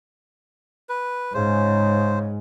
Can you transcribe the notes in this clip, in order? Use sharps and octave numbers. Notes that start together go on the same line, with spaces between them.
B4
G#2 C#3 C5